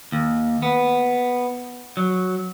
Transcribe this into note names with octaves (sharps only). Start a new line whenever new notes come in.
D#2
B3
F#3